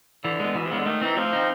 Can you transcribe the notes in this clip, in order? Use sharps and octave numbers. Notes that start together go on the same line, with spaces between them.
D3 E3
G#3 B3
B2 E3
C3
C#3 G#3 B3
D3
D#3 A3
E3 C4 D#4
F3 A3
C4 D#4